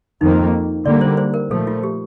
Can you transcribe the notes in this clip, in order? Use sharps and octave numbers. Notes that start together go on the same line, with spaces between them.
F2 D#3 A#3 D#4
D3 G3 A#3 D5
C5
C5
A#4
A#2 F3 A3 A4
F4
G4